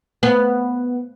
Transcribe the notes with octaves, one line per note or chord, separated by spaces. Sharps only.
B3